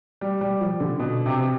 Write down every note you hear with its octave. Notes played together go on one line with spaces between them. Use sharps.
G3
G3
F3
D3
B2
C3